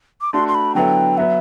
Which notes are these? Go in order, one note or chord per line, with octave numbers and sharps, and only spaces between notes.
D6
A3 D4 F#4 C6
C6
B5
D3 F#3 B3 E4 A4 G5
F#3 B3 E5